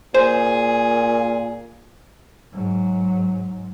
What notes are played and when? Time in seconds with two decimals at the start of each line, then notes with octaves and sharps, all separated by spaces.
0.14 A#2 G#4 C5
2.52 G#2 F#3